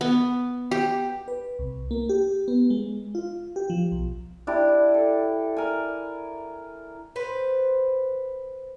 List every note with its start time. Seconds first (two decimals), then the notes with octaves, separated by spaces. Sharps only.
0.01 B3
0.71 G4
1.28 B4
1.59 C2
1.91 A#3
2.09 G4
2.48 B3
2.70 G#3
3.15 F4
3.56 G4
3.70 F3
3.92 B1
4.47 D4 E4 G4
4.94 A4
5.57 A#4 G#5
7.16 B4 C5